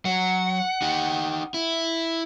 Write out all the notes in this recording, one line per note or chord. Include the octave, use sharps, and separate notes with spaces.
F#3 F#5
D#4 G4
E4